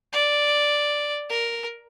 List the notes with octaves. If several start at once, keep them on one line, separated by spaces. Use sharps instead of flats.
D5
A#4